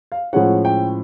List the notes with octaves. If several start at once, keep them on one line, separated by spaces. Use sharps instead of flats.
F5
A2 F3 G#3 C#4 F#5
G5